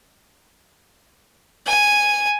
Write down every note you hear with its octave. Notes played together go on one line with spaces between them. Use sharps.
G#5